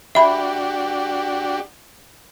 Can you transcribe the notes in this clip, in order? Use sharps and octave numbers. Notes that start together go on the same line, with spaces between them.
D4 F#4 G4 E5 B5